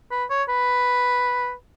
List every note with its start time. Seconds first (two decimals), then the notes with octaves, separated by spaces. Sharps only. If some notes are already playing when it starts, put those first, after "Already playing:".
0.11 B4
0.30 C#5
0.49 B4